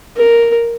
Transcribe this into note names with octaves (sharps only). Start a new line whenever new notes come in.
A#4